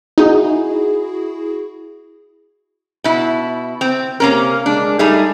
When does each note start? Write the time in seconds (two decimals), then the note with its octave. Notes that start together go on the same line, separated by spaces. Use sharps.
0.18 D#4 E4 F#4 G#4
3.04 B2 E4
3.81 C4
4.20 C3 A#3 C#4 A#4
4.66 G#3 D4
4.99 G3 A3 D#4 G#4